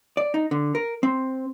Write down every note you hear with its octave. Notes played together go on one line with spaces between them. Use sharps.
D5
D#4
D3
A#4
C4